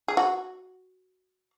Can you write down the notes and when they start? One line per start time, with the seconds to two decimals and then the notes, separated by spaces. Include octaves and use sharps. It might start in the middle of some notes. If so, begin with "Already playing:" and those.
0.08 G#4
0.17 F#4